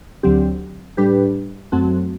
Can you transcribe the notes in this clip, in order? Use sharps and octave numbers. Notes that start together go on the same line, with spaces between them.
D2 D3 F#3 C4 G4
A2 G3 D4 G4 B4
F#2 F#3 A3 C4 F#4